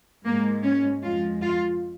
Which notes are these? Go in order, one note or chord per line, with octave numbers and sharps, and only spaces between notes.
G#2 G#3 A#3
C#4
F2 F3 G#3 F4
F4